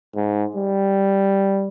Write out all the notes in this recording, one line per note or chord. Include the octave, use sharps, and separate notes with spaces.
G#2
G3